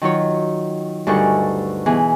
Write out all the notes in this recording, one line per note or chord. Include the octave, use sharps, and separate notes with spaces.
D#3 F#3 F4 C#5
D2 G2 D#4 G#4 A4 C#6
B2 E3 G#4